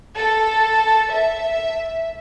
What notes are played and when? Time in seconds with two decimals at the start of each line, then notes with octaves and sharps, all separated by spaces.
0.17 A4
1.14 E5